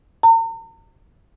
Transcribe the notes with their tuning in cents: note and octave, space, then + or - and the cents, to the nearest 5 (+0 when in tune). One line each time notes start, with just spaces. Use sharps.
A#5 -45